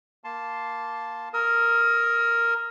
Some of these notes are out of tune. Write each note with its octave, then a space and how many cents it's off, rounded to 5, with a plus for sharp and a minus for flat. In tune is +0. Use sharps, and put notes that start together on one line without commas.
A#3 +0 A5 -5 C6 +0
A#4 +0 D#6 +40